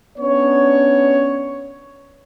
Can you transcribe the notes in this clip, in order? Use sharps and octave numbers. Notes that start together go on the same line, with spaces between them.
B3 C#4 D4 C#5